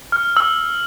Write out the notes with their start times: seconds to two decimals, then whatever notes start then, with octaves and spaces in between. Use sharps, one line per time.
0.12 F6
0.37 E6